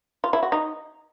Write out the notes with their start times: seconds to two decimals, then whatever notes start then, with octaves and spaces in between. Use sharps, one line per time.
0.24 F4
0.33 E4
0.43 F#4
0.52 D#4